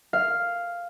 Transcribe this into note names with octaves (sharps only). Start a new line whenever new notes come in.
F5